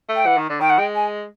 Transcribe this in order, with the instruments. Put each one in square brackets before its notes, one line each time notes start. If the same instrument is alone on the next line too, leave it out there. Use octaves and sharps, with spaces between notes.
[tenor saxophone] A3
[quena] G5
[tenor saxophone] E3 [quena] F#5
[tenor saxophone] D#3
D3
[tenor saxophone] D#3 [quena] G5
[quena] F#5
[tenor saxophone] G#3 [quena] G5
[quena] G#5